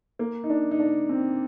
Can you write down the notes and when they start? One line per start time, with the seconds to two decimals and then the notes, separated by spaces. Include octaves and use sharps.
0.19 A#3
0.44 D#4
0.50 D4
0.71 D#4
0.79 D4
1.09 C4